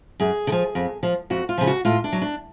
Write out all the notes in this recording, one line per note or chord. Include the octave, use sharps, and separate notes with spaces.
F#2 G#4
D3
F3
F2
F3
F2 F#4
F4
C#3 F3
F#4
A2 F4
D4
F#3
D4